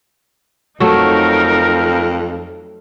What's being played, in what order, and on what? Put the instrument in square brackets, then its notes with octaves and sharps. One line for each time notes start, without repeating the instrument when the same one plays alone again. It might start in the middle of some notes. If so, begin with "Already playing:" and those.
[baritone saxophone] F2 [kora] F#3 A3 [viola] D#4 A#4